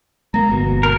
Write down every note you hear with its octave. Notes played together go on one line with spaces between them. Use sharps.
G#3 A#3 A#5
G1 B2
A#4